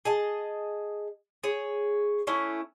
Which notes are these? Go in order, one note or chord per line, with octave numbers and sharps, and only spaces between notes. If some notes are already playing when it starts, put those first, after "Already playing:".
G#4 D#5 A5
G#4 C#5
A3 C#4 E4